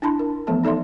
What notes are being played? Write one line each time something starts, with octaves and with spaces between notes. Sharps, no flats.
D4 E4 A5 B5 C6
A#4
E3 F3 A3 B3 A4 A5
D#4 A4 D5 E5 C6